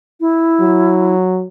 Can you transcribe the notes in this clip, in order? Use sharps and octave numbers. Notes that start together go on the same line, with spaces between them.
E4
F#3